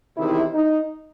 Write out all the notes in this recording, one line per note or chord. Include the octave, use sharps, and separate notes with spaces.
E2 C3 D#3 E4
D#4